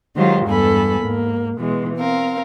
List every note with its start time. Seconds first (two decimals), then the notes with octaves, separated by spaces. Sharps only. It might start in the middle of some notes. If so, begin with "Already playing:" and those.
0.15 D#3 F#3 G#3 F4 G4 C5
0.46 E2 G2 A4 G#5 B5
0.99 G#2 A#3
1.57 B2 E3 G#3
1.97 C4 A#4 F5